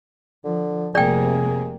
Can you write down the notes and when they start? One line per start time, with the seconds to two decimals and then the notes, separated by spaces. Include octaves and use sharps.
0.45 D3 F3
0.95 F1 C3 A#3 G#4 D5 G5